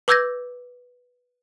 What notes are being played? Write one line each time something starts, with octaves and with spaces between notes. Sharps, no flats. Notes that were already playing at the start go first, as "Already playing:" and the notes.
B4 D6 E6 G6 G#6 A#6